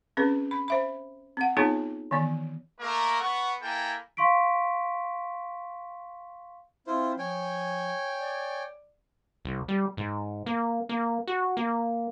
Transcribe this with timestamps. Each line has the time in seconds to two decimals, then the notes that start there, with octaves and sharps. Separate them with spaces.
0.17 C4 C#4 G#4 B4
0.51 B5
0.68 C5 E5 B5
1.37 C4 F#5
1.57 B3 C4 D#4 F4 G#4 C#5
2.11 D#3 E3 B3 D5
2.80 A3 A#3 A#4
3.20 B3 F#5 C#6
3.61 A#3 E4 A4 A#4 G5 G#5
4.17 F5 C6 C#6 B6 D7
6.87 C4 E4 F4 C5
7.19 F3 C#5 G5 G#5
8.17 D5
9.45 C2
9.68 G3
9.97 G#2
10.46 A#3
10.89 A#3
11.27 F#4
11.57 A#3